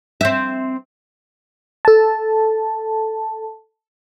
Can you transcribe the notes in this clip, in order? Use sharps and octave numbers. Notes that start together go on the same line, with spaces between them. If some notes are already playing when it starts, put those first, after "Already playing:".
C4 E5
A4 A5